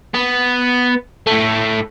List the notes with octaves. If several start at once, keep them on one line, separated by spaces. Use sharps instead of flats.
B3
A2 A3